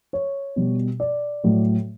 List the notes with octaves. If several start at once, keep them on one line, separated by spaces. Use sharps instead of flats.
C#5
B2 G3
D5
A2 F#3